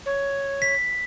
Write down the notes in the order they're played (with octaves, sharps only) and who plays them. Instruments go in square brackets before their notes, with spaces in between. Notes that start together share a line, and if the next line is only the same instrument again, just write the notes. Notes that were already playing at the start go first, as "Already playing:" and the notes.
[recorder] C#5
[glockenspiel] B6